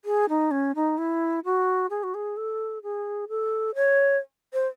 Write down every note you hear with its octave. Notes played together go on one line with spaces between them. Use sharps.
G#4
D#4
C#4
D#4
E4
F#4
G#4
F#4
G#4
A4
G#4
A4
C#5
C5